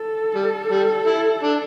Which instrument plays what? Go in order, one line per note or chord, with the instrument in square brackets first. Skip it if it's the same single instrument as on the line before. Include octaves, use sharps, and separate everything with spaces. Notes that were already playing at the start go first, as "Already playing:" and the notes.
Already playing: [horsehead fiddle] A4
[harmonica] G3
G3
E4
D4